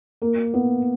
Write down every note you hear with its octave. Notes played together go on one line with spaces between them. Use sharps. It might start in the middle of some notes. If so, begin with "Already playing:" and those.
A#3
B3